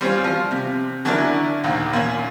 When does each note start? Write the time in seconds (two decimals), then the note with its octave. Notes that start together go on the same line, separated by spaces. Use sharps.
0.01 G3 C4 C#4 F4
0.24 F3 F6
0.51 C3
1.05 D3 F#3 C#4 D4 E4 A#4
1.64 A#1 D#2
1.93 A#2 C#4